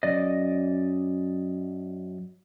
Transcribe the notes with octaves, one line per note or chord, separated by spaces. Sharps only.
F#2 D5 D#5